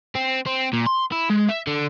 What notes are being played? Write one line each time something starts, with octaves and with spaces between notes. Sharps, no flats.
C4
C4
A#2
C6
E4
G#3
E5
D3